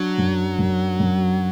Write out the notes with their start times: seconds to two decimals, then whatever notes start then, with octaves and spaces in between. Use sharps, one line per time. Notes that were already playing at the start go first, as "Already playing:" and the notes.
Already playing: F#3 D4
0.18 F#2
0.59 F#2
1.00 F#2